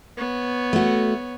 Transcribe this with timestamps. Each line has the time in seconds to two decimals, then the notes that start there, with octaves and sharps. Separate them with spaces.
0.17 B3 C#5
0.73 A3 F#4